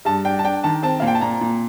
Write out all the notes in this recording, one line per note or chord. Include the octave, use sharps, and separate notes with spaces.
G2 A5
D4 G5
A5
D4 G5
D#3 A5
C4 A5
A#2 F5
G5
A5
A#2 A#5
A#2